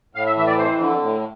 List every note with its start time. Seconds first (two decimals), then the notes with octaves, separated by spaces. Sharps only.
0.15 A2 F5
0.26 E5
0.37 E3 E5
0.47 D5
0.58 F2 C5
0.80 D3
1.02 A2